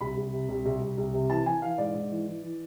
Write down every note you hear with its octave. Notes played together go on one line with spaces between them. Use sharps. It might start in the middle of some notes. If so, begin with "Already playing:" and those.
C2 B5
C2
C3
C2
C2
C2
C2
C3
E3 A5
E3 G#5
E3 F5
G#2 D5
G#2
E3
E3
E3